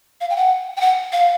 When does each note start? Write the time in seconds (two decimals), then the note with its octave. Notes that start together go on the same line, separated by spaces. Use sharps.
0.21 F5
0.30 G5
0.36 F#5
0.77 G5
0.81 F#5
1.12 F5